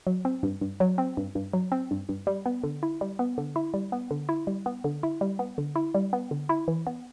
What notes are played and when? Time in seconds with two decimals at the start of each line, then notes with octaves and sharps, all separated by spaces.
0.07 F#3
0.25 C4
0.43 G2
0.61 G2
0.80 F#3
0.98 C4
1.17 G2
1.35 G2
1.53 F#3
1.72 C4
1.91 G2
2.09 G2
2.27 G3
2.46 B3
2.63 D3
2.83 E4
3.01 G3
3.19 B3
3.38 D3
3.56 E4
3.74 G3
3.92 B3
4.11 D3
4.29 E4
4.47 G3
4.66 B3
4.84 D3
5.03 E4
5.21 G3
5.39 B3
5.58 D3
5.76 E4
5.95 G3
6.13 B3
6.31 D3
6.49 E4
6.68 E3
6.87 B3